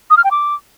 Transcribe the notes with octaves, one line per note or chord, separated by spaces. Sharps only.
D#6
F6
G5
D6